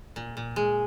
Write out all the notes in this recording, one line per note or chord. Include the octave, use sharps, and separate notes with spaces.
A#2
A#2
G#3